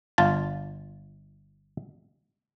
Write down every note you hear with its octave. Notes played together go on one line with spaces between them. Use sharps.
G1 F4 A5